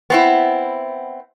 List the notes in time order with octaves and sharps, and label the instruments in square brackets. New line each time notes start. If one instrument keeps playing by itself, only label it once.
[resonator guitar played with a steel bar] B3 C4 E4